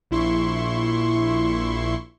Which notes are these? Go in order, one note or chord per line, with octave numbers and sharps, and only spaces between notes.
A#1 E4 C6 C#6